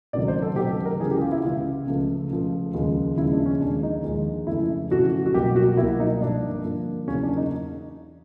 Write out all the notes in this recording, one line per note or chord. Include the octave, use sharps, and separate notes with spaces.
C#2 C3 D#3 F#3 A3 D5
C5
A4
C#2 C3 D#3 F#3 A3 G4
A4
A#4
C#2 C#3 E3 G#4
G4
F4
E4
C#2 C#3 E3 F4
C#2 C#3 F3 A3
C#2 C#3 F3 A3
D#2 C#3 F3 G#3
D#2 C#3 F3 G#3 E4
D4
C#4
D#2 D3 F3 G#3 D4
D#4
D#2 D3 F3 G#3
F2 C#3 E3 A3 E4
F2 C#3 E3 A3 F#4
F#4
C2 B2 F#3 A#3 G4
F#4
C2 B2 F#3 A#3 E4
D#4
G2 D3 F3 A#3 D4
G2 D3 F3 A#3
E2 C#3 F#3 A#3 C#4
D4
D#4